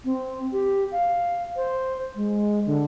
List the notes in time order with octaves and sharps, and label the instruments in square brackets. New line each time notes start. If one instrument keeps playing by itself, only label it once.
[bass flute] C4
G4
F5
C5
G#3
D3